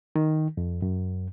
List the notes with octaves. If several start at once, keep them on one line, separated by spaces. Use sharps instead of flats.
D#3
F2
F#2